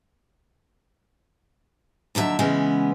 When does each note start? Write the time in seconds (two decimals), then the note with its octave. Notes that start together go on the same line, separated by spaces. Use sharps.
2.15 D#2 D3 F#3 E5
2.39 C#3 E3 G#3 B3 C#4